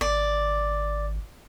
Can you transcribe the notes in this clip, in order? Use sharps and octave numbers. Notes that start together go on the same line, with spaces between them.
G#1 D5